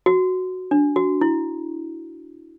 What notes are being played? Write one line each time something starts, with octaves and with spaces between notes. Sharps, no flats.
F#4
D4
F#4
E4